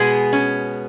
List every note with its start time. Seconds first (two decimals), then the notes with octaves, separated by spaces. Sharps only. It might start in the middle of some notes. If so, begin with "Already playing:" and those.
Already playing: B2 G#3 B3 G#4
0.33 C#4